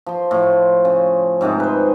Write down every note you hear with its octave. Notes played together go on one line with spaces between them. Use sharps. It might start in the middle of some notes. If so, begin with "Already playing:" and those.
F3 C6
A2 F3
C#3
G#2 C3 D#3 G#3
B4 C5